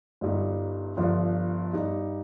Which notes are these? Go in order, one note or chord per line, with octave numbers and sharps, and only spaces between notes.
G1 G2 G3 D#4
G1 G2 F3
G2 G3 D#4